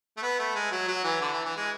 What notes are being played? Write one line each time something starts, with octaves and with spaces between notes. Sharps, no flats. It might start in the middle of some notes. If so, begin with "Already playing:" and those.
A3
B3
A3
G#3
F#3
F#3
E3
D3
E3
E3
G#3